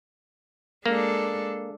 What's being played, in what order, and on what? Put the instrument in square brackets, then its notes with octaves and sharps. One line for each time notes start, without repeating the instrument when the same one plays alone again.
[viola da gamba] G#3 D4 A4 [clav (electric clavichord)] A#3